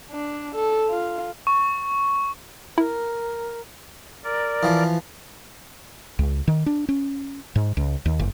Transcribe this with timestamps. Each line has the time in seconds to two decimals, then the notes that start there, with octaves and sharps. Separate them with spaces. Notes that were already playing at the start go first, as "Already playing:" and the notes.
0.11 D4
0.55 A4
0.90 F4
1.47 C#6
2.78 E4 A#4
4.24 A#4 D5
4.63 E3 F3
6.19 C#2
6.48 D#3
6.66 D4
6.89 C#4
7.56 G#2
7.77 C#2
8.06 D#2
8.19 F#1